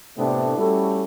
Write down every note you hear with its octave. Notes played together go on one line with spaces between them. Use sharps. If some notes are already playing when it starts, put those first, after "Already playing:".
A2 C3 A3 B3 D4
G3 A3 C#4 E4 F#4 A4